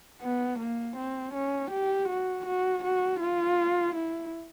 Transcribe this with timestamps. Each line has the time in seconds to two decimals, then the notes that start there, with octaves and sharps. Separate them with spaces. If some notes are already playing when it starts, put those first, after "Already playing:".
0.21 B3
0.59 A#3
0.97 C4
1.34 C#4
1.71 G4
2.08 F#4
2.46 F#4
2.84 F#4
3.20 F4
3.96 E4